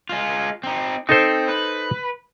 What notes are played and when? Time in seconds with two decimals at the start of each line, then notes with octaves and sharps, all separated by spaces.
0.09 G#3 F4
0.64 C4 D#4
1.09 C4 D#4 A4 C5
1.48 B4